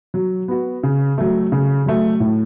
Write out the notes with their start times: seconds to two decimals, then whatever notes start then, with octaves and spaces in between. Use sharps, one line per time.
0.14 F#3
0.48 B3 F#4
0.83 C#3
1.18 F#3 A3
1.52 C#3
1.86 F#3 A3
2.20 A2